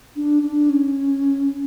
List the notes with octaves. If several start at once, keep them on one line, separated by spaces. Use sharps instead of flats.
D4
D4
C#4